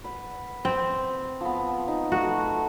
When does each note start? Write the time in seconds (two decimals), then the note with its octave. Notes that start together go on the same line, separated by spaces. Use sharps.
0.04 B4 F#5
0.65 C4
1.41 F3 B3
1.88 D#4
2.12 A3 F#4